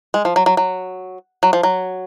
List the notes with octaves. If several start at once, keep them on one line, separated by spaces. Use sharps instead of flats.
G#3
F3
F#3
F#3
F#3
F#3
F3
F#3